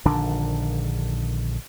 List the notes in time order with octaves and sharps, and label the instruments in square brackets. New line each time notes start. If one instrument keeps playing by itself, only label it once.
[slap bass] A#1 D3 D#3 D4